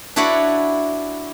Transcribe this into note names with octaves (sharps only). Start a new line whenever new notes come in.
D4 E4 F#4 B4 C#5 D5